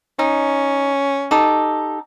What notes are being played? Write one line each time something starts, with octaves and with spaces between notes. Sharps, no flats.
C#4 D#4
D#4 G4 A4